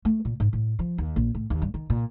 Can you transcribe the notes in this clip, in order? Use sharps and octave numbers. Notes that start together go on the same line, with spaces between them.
A3
A#2
G#2
A2
F3
D#2
A#1
A2
D#2
G2
D#3
A#2